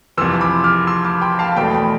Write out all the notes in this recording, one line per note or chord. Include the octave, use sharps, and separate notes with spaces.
F2 C3 E3 C6 E6
B5 D6
D6 F6
C6 E6
B5 D6
G5 B5
F5 A5
E2 B2 A3 G5 B5
G5 B5